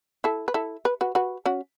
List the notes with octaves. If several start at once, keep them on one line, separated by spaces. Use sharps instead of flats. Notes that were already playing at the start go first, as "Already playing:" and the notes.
E4 A4
B4
E4 A4
B4
F#4 B4
F#4 B4
C#4 F#4